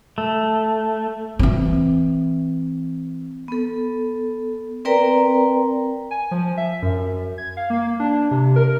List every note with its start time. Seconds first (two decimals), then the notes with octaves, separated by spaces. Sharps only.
0.18 A3
1.39 E3 C4
3.48 B3 A4
4.85 C4 A#4 B4 D5 G5 A#5
6.11 G#5
6.31 F3
6.57 E5
6.82 F#2
7.38 G#6
7.57 F5
7.70 A#3
8.00 D4
8.31 C3
8.56 A#4